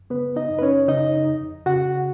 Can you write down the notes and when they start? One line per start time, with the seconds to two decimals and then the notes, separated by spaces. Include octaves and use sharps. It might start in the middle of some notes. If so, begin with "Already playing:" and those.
Already playing: F#2
0.10 C#3 B3 B4
0.36 D#4 D#5
0.50 F#2
0.59 B4
0.62 C#4 C#5
0.88 C#3 D#4 D#5
1.27 F2
1.66 C#3 F#4 F#5